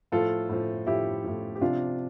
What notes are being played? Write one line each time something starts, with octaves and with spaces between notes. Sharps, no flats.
A2 F3 F4 A4
A2 F3
A2 F3 E4 G4
A2 F3
G4
C3 F3 D4 F4